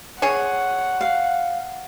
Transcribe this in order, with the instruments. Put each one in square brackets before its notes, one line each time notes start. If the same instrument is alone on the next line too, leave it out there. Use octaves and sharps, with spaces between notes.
[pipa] G#4 C#5 [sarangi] F#5
[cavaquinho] F5